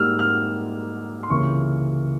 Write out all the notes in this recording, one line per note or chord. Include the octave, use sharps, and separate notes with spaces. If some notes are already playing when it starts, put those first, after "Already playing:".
Already playing: G#2 G3 A#3 E6 F6
F6
C6
C#2 C3 E3 A#3 C#4 C#6